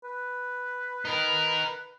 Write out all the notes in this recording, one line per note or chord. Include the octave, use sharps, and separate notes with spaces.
B4
D#4 A#4